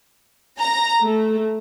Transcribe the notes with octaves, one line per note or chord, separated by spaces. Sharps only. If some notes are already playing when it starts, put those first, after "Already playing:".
A#5
A3